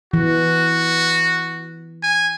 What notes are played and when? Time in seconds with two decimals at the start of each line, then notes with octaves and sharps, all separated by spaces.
0.13 E3 F#4
2.03 G#5